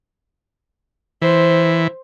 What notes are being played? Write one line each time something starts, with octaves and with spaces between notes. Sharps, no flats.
E3 C5